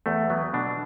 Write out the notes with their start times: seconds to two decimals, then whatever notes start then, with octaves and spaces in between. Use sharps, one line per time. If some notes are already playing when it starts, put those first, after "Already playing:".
0.06 E2 A3
0.30 F#3 B3
0.54 B2 D4